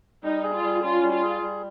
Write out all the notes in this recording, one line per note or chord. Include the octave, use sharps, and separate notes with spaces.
G3 D#4
G#4
F4
G3
C#4 F4
G3
F4
G#4
G3